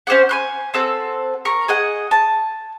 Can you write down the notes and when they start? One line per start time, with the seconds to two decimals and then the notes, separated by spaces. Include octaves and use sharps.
0.07 C#4 C5 D5 F#5
0.29 G#5 C6 F#6
0.74 C4 A4 F#5
1.45 A#4 C#6
1.68 G#4 D#5 F#5
2.11 A5